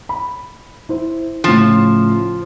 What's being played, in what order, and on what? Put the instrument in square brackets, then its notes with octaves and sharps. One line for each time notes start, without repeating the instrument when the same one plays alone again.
[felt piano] B5
E4 C5
[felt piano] A2 C#3 E7 [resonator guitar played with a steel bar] F3